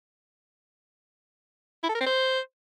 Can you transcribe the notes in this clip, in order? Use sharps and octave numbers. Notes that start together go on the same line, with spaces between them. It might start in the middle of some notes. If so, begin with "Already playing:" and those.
E4
A4
A#4
C4
C5